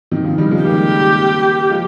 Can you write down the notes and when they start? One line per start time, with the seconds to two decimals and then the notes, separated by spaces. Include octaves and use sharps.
0.12 C3 D#3
0.24 C#3 F3
0.38 D#3 G3
0.51 F3 G#3
0.64 G3 A#3 G4
1.70 F3 G#3